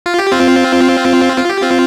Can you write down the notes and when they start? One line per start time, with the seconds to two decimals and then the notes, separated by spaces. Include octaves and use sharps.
0.06 F4
0.18 G4
0.32 C4 F4
1.37 F4
1.49 G4
1.62 C4 F4